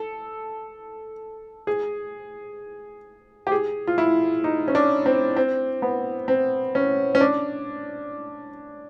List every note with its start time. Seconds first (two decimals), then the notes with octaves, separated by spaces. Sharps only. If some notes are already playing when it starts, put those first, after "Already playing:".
Already playing: A4
1.67 G#4
3.47 G4
3.52 G#4
3.87 F4
3.98 E4
4.44 D#4
4.68 C#4
4.75 D4
5.06 C4
5.36 C4
5.82 B3
6.28 C4
6.75 C#4
7.15 C#4
7.21 D4